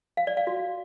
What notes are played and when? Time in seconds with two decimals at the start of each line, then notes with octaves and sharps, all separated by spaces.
0.17 F5
0.27 D5
0.37 F5
0.47 F#4